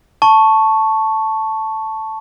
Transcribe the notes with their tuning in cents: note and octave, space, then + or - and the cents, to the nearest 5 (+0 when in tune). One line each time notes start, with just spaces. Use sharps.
A5 +0 C#6 +0